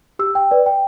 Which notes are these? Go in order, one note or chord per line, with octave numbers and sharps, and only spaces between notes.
G4 E6
G5
B4 D5
G5